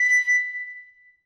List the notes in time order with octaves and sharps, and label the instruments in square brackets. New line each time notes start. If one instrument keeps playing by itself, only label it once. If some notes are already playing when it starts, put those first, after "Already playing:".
Already playing: [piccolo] B6